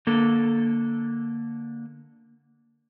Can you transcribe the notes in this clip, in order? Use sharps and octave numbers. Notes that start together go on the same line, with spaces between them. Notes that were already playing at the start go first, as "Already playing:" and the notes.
D3 A#3 A4